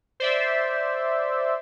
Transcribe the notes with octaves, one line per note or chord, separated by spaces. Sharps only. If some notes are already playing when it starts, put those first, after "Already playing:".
C5 D5 E5